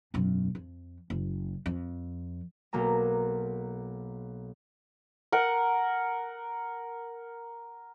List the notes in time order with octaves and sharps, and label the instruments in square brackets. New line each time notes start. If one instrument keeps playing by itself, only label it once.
[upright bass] E1 F#2
F2
F#1
F2
[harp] B1 A#3 A#5
[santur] A#4 F#5